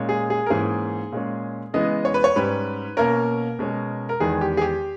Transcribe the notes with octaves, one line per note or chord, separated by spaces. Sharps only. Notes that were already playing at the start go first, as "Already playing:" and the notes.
Already playing: A#2 G#3 C#4
G#4
G#4
A#4
G#2 E3 A#3 C#4 G#4
A#2 G#3 C#4
C#3 E3 G#3 B3 D#5
C#5
B4
C#5
G#2 G3 C#4 B4
B2 A#3 C#4 A#4
B2 G#3 C#4
A#4
E2 D#3 G#3 B3 G#4
G4
G#4
G4